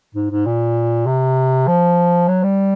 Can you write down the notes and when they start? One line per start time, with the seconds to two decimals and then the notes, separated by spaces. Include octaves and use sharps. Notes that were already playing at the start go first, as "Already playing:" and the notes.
0.15 G#2
0.30 G#2
0.46 A#2
1.06 C3
1.67 F3
2.28 F#3
2.43 G3